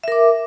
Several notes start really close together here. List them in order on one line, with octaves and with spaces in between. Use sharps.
E5 A#4 D6